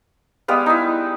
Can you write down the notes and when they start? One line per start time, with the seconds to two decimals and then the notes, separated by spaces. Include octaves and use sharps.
0.48 G3 G#3 B3 F5
0.66 D#4 E4